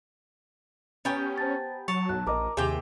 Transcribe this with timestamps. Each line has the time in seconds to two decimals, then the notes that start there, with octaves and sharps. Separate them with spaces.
1.05 B3 C#4 G4 G5 G#5 A#5 B5
1.38 C5 A5 A6
1.88 F#3 A5 C#6 C#7 F7
2.09 B1 F#6
2.27 A#1 A#4 D#5 A#5 D6
2.57 D#2 C3 G#4 G5 G#5 D6 G6 F7